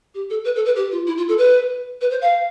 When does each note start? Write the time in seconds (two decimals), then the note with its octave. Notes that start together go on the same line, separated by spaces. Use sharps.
0.14 G4
0.30 A4
0.44 B4
0.55 A4
0.65 B4
0.75 G4
0.91 F4
1.07 E4
1.17 F4
1.28 A4
1.38 B4
2.01 B4
2.10 C5
2.21 F5